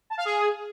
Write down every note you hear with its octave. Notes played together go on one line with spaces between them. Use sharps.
A5
F5
G#4